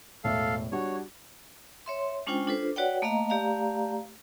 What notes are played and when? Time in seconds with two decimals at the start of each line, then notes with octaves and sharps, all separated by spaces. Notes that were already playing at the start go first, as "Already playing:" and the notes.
0.24 E1 A2 A4 E5 F5
0.72 G3 D4 F#4 C#5
1.86 C#5 E5 C6
2.27 G#3 C#4 D4 F4 C5 G5
2.47 D4 F4 A4 B4 C5
2.76 F#4 B4 C#5 D5 F#5 G5
3.02 A3 A#3 D#5 F5 A#5
3.29 A3 G4 D5 F5 A#5